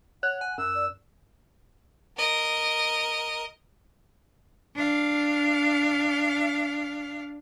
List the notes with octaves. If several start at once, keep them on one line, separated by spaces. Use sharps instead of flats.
C#5 F#5 F#6
G#5
F#2 E6
D5
A#4 D#5
D4 F5